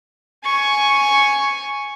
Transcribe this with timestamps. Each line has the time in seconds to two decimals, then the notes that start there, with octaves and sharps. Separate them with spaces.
0.45 G#5 C#6